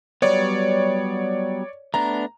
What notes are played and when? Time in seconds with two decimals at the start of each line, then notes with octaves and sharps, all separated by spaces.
0.22 F#3 G3 B3 C#5 D5
1.94 A3 B3 D4 A#5